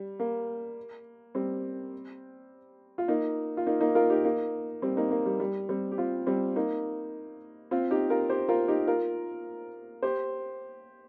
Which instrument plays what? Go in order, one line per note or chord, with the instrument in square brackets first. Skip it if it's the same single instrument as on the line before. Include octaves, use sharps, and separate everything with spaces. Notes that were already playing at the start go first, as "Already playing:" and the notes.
Already playing: [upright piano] G3
A#3
G3 C4
F4
A#3 D#4
F4
A#3 D#4
A#3 D#4
F4 A#4
D#4 G4
A#3 D#4
G3 C4
A#3 D#4
A#3
G3
G3
G3 C4
G4
C4 F4
G3 C4
A#3 D#4
C4 F4
D#4 G4
F4 A#4
G4 C5
F4 A#4
D#4 G4
F4 A#4
G4 C5